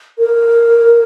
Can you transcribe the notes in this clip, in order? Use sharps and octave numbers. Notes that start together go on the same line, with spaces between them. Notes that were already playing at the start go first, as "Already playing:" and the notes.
A#4